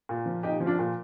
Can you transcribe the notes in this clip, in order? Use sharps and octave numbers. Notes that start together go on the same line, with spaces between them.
A#2
F3
A#2 D#4 G4
F3
D4 F4
A#2